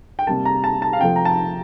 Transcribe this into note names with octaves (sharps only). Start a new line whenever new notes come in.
G5
C3 G3 A#3 A5
A#5
A5
A5
F5
C3 F3 A3 G5
A#5
A5